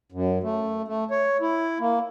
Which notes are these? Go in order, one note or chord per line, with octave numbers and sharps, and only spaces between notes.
F#2
A3
A3
C#5
E4
A#3